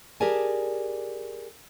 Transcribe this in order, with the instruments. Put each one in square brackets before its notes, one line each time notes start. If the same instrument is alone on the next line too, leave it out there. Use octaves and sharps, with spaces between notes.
[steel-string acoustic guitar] G4 G#4 A#4 D5 G#5 A5